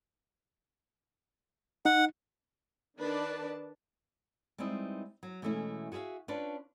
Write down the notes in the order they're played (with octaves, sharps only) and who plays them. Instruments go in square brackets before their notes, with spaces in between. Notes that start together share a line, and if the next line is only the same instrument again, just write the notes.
[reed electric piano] D#4 [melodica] F#5
[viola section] D#3 D4 B4 D5 A5
[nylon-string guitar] G3 G#3 B3 C4 D#4 E4
F#3
B2 E3 G#3 A3 C#4 E4
F#4 G#4 A#4 E5 F5
C#4 D4 F4 B4 C#5 A5